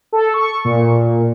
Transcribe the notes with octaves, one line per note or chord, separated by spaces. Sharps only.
A4
C#6
A#2